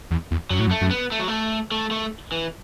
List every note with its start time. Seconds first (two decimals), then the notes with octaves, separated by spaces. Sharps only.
0.11 E2
0.31 E2
0.51 F#2 F#3
0.59 A2
0.67 F#2
0.71 A3
0.81 F#2
0.91 B3
1.11 A3
1.20 F#3
1.28 A3
1.71 A3
1.91 A3
2.32 E3